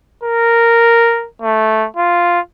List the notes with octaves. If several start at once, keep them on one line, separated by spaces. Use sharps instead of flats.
A#4
A3
F4